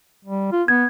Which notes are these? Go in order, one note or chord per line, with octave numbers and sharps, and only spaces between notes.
G3
F4
B3 G#6